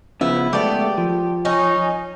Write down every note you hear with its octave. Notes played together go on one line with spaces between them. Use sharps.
C#3 F3 B3 E4
G#3 A3 B3 G4 D5
F3
C#4 D#4